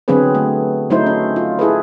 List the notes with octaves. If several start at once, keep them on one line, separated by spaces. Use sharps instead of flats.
D3 F#3 B3 C4 G#4 B4
A3
F#3 A3 D#4 E4 C5
C#4
F4
E4 G#4 A4 B4